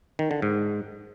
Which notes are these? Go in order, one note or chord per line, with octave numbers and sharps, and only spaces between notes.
D#3
D3
G#2